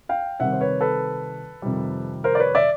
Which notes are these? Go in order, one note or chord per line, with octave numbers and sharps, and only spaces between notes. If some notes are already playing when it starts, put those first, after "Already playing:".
F5 G5
C3 D#3 G3 C4 E5 F#5
C5
B4 C#5
A4 B4
F2 C3 D#3 G3
A#4 C5
D5
B4 C#5
D5 E5